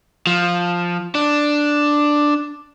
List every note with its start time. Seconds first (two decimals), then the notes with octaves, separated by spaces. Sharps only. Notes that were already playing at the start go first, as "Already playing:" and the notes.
0.27 F3
1.15 D4